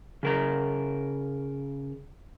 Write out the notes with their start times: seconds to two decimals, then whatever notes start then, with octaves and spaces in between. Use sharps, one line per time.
0.23 C#3 A#4 A#5